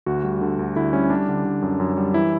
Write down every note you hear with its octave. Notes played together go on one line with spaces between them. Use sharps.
D2 F#4
G3
D3
D2
D3 E4
G3 C#4
G3 D4
D3
D3
F#2
F#2
G3
E3 E4